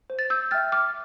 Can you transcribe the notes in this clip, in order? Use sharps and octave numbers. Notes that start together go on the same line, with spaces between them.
C5
A6
E6 G6
E5 G5 F6 A6
D6 F6